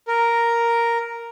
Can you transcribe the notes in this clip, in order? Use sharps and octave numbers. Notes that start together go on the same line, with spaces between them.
A#4